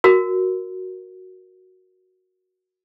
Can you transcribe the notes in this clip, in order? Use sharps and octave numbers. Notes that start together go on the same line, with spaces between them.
F#4 A#4